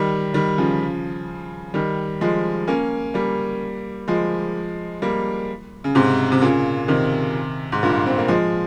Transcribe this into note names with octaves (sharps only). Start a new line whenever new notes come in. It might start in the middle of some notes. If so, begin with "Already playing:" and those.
Already playing: D#3 G3
D#3 G3
C#3 F3
D#3 G3
F3 G#3
A#3 C#4
G3 A#3
F3 G#3
G3 A#3
C#3
G#2 C3
C3
A#2 C#3
C3 D#3
G#2
G2 A#2
C4
A#3
F3 G#3